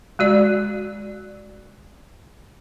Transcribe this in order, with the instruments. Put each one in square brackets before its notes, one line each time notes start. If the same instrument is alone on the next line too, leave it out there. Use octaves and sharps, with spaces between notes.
[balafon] G#3 F#4 D5